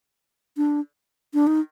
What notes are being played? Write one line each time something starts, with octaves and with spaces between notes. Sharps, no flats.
D4
D4
D#4